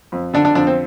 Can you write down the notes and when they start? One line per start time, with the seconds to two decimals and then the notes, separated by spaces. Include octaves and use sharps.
0.12 F2
0.34 D3 D4
0.45 D4
0.55 F2 D4
0.67 C4